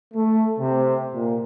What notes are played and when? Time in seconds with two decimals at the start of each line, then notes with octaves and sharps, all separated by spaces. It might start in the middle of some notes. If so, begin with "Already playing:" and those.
0.14 A3
0.58 C3
1.15 A#2